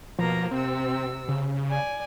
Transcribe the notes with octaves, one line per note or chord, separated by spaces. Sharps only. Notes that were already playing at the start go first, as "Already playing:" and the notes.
B2 F3 A#3 A#5
C3 C4 E6
C#3
D5 G#5